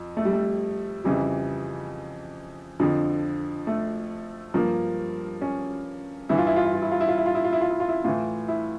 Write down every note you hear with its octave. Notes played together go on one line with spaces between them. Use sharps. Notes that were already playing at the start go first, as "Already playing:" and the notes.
Already playing: F2
A3
G3
A3
F2 C#3 E3 G3
F2 D3 F3
A3
G2 F3 A#3
C#4
G2 E3 E4
F4
E4
F4
E4
F4
E4
F4
E4
F4
E4
F4
E4
F4
E4
F4
E4
F4
E4
A2 E3 F4
E4